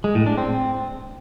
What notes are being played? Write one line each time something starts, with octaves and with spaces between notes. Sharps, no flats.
G#3
A2
D4
C4